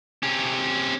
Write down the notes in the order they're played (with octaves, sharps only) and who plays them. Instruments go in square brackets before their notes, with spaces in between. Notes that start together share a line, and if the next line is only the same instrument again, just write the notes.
[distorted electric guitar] C3 C#4